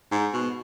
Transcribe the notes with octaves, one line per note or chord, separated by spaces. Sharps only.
G#2
B2